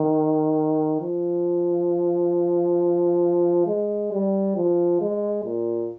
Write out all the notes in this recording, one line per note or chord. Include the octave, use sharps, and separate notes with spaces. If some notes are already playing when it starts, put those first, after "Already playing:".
Already playing: D#3
F3
G#3
G3
F3
G#3
A#2